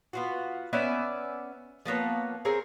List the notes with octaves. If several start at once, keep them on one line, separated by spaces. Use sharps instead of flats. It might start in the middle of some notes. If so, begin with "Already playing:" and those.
B3 F4 F#4
B3 C#4 D5 E5
F3 A#3 B3 C#5
C4 G#4 A#4 C#5